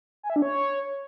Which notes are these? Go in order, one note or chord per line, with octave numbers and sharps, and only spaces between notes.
G#5
E5
D4
C#5